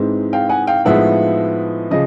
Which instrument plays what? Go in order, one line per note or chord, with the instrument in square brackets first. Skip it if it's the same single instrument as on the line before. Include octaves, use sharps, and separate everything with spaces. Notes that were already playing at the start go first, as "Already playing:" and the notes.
Already playing: [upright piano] G#2 E3 G#3 C4
F5 G5
F#5 G#5
F5 G5
A2 F3 G#3 B3 D#4 E5 F#5
C#3 F3 D#5